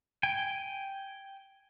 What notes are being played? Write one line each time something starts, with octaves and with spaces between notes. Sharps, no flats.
G5 G#5